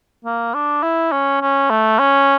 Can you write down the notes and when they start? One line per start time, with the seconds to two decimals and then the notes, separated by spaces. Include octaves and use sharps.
0.25 A#3
0.54 D4
0.83 E4
1.12 C#4
1.41 C#4
1.70 A3
1.99 C#4